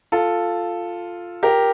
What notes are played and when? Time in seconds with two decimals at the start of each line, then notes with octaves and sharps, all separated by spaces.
0.12 F4 A4
1.43 G4 A#4